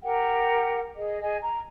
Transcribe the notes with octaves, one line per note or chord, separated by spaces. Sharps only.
G4 A#4 F#5 G5
G#4 D#5
G#4 D#5 G#5
A#5